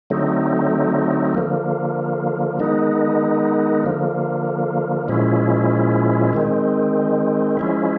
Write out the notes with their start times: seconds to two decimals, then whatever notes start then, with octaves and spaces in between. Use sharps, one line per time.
0.10 D3 F#3 A3 C4 D#4
1.35 D3 F3 A#3
2.59 D#3 G#3 B3 D#4
3.83 D3 F3 A#3
5.08 A#2 F3 G#3 C#4 E4
6.33 D#3 G#3 C4
7.57 F3 G#3 C#4 E4